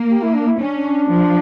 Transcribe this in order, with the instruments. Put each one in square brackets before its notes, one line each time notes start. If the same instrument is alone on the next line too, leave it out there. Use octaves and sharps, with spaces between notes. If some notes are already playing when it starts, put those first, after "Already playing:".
Already playing: [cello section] A#3
[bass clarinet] G4
E4
D4
E4
[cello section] C#4 [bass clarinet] D4
[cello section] F3